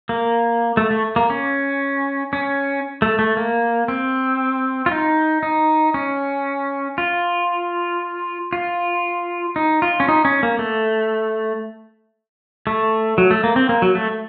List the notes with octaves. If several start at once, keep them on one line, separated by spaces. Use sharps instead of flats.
A#3
A3
A3
A#3
C#4
C#4
A3
A3
A#3
C4
F4
D#4
D#4
C#4
F4
F4
D#4
F4
C#4
D#4
C#4
A#3
A3
A3
F#3
A3
A#3
C4
A#3
F#3
A3